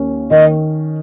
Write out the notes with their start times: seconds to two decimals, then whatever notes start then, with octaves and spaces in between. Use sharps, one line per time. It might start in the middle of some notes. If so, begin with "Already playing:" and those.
Already playing: D#2 C#4
0.31 D#3 D#5